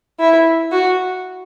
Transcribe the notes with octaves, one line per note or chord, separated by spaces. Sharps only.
E4
F#4